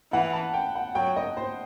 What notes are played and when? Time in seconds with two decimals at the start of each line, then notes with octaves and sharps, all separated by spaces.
0.12 E3 F#5
0.33 A5
0.54 G5
0.75 F#5
0.95 F#3 G5
1.16 D#5
1.37 C5